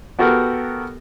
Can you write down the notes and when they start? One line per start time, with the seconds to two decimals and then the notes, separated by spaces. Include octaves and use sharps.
0.19 B3 F#4 G4 A4 A#4